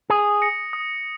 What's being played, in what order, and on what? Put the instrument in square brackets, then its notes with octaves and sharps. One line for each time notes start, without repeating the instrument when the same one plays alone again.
[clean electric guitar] G#4 [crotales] D#6
[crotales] A#6 C#7
D#6